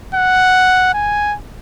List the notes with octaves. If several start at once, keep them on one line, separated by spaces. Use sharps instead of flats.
F#5
G#5